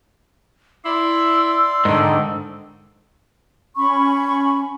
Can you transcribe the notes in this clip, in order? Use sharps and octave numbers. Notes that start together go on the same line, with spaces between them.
E4 D5 C6 E6
G#2 D3 D#3
C#4 B5 C#6